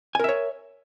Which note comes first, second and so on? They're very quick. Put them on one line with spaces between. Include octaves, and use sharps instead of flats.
G#5 A#4 E5 C#5